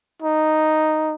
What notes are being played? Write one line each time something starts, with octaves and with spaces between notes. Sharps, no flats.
D#4